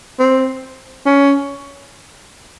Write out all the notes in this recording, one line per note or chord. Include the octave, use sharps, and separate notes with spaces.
C4
C#4